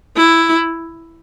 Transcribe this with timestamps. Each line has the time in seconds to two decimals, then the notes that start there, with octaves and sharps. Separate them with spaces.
0.16 E4